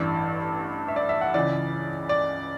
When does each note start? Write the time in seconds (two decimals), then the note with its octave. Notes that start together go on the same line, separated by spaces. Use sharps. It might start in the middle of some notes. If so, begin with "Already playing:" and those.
Already playing: A1 G2 E3 D5
0.88 E5
0.96 D5
1.09 E5
1.21 F#5
1.34 C#2 C#3 E3 D5
2.09 D5